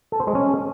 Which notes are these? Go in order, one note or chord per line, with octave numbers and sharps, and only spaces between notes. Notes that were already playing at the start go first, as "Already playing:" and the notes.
A4
C5
G#3
C#4